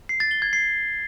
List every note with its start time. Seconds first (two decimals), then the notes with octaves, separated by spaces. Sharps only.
0.09 C7
0.20 A6
0.31 G7
0.42 G#6
0.53 C7